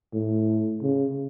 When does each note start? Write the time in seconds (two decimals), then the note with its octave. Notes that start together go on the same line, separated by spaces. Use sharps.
0.13 A2
0.82 C#3